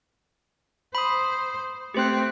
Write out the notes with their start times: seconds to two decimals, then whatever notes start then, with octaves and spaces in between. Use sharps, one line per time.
0.95 C5 B5 D#6
1.94 A3 C4 G4 C5 F#6